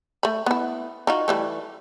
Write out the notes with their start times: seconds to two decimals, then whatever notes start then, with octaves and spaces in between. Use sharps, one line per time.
0.23 A3 B5
0.46 B3 E4
1.07 D#4 F4 F#4
1.28 E3 G3 A3